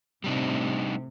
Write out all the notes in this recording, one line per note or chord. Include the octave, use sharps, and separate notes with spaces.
A2 C3 G3 D4 D#4